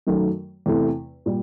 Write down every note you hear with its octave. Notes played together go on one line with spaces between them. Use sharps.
F#2 D#3 F#3 A3
E2 C3 E3 A3
A#2 G3